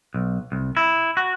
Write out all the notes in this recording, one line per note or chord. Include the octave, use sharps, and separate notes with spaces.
B1
C2
E4
F#4